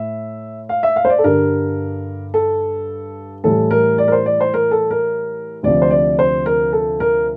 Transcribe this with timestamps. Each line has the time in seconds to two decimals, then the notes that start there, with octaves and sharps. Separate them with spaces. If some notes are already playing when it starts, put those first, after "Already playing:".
Already playing: A2 E5
0.69 F5
0.83 E5
0.96 F5
1.05 C5
1.10 D5
1.19 A4
1.24 G2 D3 G3 A#4
2.34 A4
3.44 A2 E3 G3 A4
3.71 A#4
3.98 D5
4.08 A#4
4.12 C5
4.26 D5
4.41 C5
4.54 A#4
4.71 A4
4.91 A#4
5.63 D2 C3 F3 D5
5.82 C5
5.90 D5
6.19 C5
6.46 A#4
6.73 A4
7.00 A#4